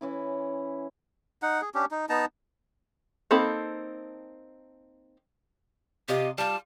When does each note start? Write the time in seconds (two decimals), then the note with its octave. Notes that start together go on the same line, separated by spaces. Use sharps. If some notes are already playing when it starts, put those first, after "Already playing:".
0.01 E3 C#4 E4
1.42 D#4 F#5
1.62 G#4
1.74 C#4 D4 G4
1.91 D#4
2.09 B3 D#4 A5 A#5
3.31 A#3 C4 D#4 A4 B5
6.08 C3 F4 G4 D#5
6.38 G3 F4 A5